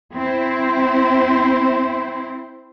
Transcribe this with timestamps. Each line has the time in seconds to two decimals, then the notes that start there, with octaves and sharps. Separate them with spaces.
0.14 C4 E4 C5